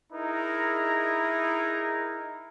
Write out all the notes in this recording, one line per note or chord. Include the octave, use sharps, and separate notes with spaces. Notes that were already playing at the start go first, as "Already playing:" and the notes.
D#4 E4 G#4 A#4 A#5